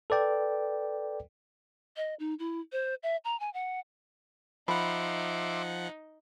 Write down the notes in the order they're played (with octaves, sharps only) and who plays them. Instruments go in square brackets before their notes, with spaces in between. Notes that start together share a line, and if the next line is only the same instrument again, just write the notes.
[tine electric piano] A4 B4 D5 G5
[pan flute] D#5
D#4
E4
C5
E5
A#5
G#5
F#5
[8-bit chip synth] F3 F#5 [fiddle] D#4 [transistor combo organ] E5 C6 D6 [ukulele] B5